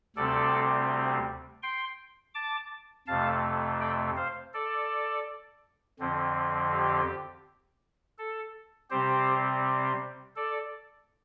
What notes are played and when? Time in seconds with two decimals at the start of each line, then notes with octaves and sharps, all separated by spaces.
0.16 D2 C3 G3 C4 A4 D5
1.63 G5 C6
2.34 A5 D6
3.07 F2 C3 A3 F5 A5
3.80 D5 G5
4.17 C5 F5
4.54 A4 D5
6.00 F2 D3 F3 C4
6.72 G4
8.18 A4
8.91 C3 G3 C4 G4 C5
10.36 A4 D5